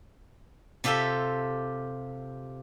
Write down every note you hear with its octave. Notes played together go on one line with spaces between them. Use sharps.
C3 F4 G4 A4 E5